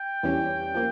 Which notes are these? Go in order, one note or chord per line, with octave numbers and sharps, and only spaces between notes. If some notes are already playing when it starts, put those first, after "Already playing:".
Already playing: G5
E2 E3 G3 C#4 G4
F3 A#3